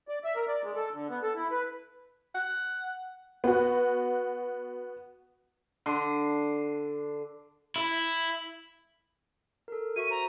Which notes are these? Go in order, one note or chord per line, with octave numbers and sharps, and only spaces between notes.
D5
E5
A#4
D5
G#3
A4
D3
B3
A4
E4
B4
F#5
B3 F#4
D3 C6
E4
A4 A#4
F#4 E5 C#6 D#7
C5 A#5